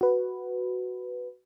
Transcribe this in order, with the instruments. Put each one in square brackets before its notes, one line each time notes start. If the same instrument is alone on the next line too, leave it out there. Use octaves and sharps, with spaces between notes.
[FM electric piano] F#4 B4